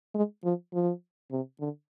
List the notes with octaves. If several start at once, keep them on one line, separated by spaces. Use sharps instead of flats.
G#3
F3
F3
C3
D3